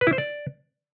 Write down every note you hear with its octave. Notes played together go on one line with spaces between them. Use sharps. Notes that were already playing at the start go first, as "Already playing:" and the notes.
B4
E4
C5
D5